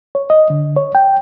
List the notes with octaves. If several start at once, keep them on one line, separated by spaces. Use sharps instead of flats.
C#5
D#5
D3
C#5
G5